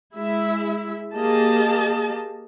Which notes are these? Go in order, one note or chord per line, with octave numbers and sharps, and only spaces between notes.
G#3 E4 E5
A#3 G4 G#4 D#5 A5